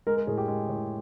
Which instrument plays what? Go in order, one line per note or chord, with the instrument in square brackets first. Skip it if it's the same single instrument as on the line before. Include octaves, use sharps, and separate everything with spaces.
[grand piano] G#3 A#4
A#4
A2 G#4
G4
G#3
A2